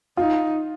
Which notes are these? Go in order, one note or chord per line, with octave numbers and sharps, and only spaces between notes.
D#4 F4